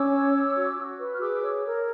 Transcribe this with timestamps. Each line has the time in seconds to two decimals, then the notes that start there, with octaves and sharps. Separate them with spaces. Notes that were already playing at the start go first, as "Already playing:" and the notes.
Already playing: C#4 D6 E6
0.12 C#5
0.33 C#5
0.55 F#4
0.77 F#4
0.99 B4
1.14 F6
1.21 G#4 D6 E6
1.43 C#5
1.65 A#4